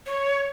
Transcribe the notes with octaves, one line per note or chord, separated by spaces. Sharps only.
C#5